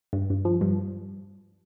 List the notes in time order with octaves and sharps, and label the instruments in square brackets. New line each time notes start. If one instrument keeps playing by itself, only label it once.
[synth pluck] G2
G2
F3
G2